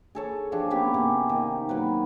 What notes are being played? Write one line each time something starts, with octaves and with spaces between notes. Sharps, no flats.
G#4 A4 C#5
F3 D4 G4 G#4
A#3 B3 C#4 G4
C3 A#3 C#4
D#3
F#3 A#3 B4